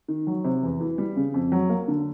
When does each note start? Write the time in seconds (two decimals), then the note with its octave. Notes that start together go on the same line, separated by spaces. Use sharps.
0.08 D#3
0.27 F#3
0.44 C3
0.63 E2
0.81 E3
0.98 G3
1.17 C#3
1.34 F2
1.52 F#3
1.70 A#3
1.88 D3